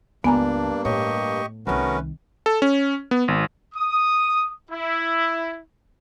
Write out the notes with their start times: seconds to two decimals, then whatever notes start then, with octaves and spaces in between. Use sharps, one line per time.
0.24 C#2 G2 A#3 B3 D4 G#5 A#5
0.85 A2 G4 C#5 D#5 C#6
1.67 C2 D#3 A3 B3 C#4 F#4 A#4 B4
2.46 A4
2.62 C#4
3.11 B3
3.28 G#1
3.75 D#6
4.71 E4